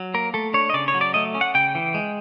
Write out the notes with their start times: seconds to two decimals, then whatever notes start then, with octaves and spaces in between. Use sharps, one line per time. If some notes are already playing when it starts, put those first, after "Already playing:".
Already playing: F#3
0.14 A#3 A#4
0.34 A3 A4
0.54 D4 C#5
0.70 D#5
0.74 C#3 D5
0.88 C#5
0.94 F#3
1.01 D5
1.14 A3 D#5
1.35 C#4
1.41 F#5
1.55 C#3 G5
1.75 E3
1.94 G#3